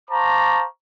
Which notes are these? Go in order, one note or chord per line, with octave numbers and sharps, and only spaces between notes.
C5 F5 A5 A#5 C#6 D6